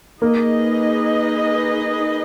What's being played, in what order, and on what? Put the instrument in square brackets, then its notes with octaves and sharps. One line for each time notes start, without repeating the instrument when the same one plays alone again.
[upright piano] A#3 [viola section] D#4 G#4 B4 D#5